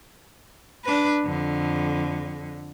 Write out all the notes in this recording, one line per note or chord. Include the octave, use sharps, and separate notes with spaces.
D4 B4
F2 D3